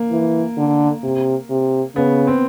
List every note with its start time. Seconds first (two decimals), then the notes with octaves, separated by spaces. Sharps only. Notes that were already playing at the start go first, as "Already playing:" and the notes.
Already playing: A#3
0.11 E3
0.57 D3
1.03 C3
1.50 C3
1.96 C#3 B3
2.27 C4